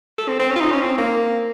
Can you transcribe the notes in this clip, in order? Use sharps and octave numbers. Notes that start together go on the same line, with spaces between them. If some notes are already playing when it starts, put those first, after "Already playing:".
A4
C4
C4
C#4
F4
D#4
C#4
C4
A#3